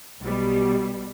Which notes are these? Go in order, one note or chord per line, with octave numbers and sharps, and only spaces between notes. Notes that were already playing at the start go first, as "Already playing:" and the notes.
B1 B2 G3